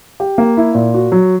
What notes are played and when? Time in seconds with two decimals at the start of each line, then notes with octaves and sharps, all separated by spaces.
0.20 G4
0.38 A#3
0.57 E4
0.75 A#2
0.94 F#4
1.12 F#3